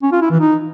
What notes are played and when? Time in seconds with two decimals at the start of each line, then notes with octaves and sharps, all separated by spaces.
0.03 C#4
0.12 F4
0.21 E4
0.31 E3
0.40 D#4